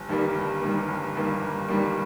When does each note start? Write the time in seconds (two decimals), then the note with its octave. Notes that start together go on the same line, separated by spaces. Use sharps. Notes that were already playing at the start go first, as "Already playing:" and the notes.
Already playing: G1
0.09 G2 D#3 G3 A#3
0.35 G1
0.62 G2 D#3 G3 A#3
0.89 G1
1.15 G2 D#3 G3 A#3
1.42 G1
1.68 G2 D#3 G3 A#3